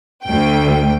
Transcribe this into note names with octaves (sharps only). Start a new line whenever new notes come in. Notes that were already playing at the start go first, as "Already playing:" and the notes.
D2 G5